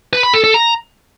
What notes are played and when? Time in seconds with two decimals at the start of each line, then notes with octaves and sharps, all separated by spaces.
0.13 B4
0.23 B5
0.34 A4
0.44 A4
0.54 A#5